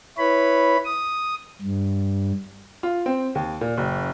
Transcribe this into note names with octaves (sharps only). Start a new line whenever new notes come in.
E4 B4 C#5 B5
D#6
G2
F4
C4
D#2
A#2
F#1